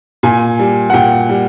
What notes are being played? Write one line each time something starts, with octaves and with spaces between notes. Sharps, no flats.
A#2 G#5
G3
F#5
A#2 G5
G3